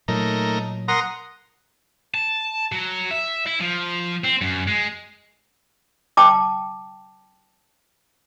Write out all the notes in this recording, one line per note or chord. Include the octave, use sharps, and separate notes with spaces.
A#2 F#3 A3 D#4 A#4
A#4 F#5 A#5 C6 D#6
A5
F#3
E5
E4
F3
C4
F#2
G#3
G5 A5 D6